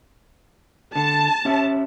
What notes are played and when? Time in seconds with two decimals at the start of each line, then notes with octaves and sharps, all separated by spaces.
0.96 D3 A5
1.45 C#4 G4 E5